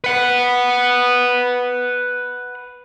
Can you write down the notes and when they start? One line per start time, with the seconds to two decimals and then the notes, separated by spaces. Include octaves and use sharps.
0.04 B4 F#5